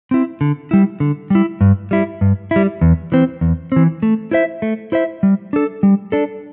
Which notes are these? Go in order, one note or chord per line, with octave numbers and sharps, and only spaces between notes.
C4 E4
D3
G3 E4
D3
G3 E4
G2
G3 E4
G2
G3 E4
E2
E3 C4
E2
E3 C4
A3
E4 C5 E5
A3
E4 C5 E5
G3
D4 A4
G3
D4 A4